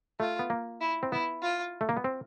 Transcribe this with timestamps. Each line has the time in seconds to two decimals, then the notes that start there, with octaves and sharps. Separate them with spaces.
0.20 A3 F4
0.39 B3
0.50 A#3
0.81 E4
1.03 C4
1.12 B3 E4
1.42 F4
1.81 A3
1.89 A#3
1.97 B3
2.04 C4